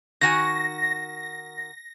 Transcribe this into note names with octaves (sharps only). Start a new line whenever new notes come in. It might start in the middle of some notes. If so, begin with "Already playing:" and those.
D#3 F#4 G#5 A#6